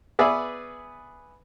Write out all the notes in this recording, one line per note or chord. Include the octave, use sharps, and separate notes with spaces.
B3 G#4 B4 D5 E5